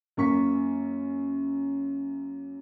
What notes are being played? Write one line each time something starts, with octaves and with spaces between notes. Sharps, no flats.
F#2 A#3 C#6 B6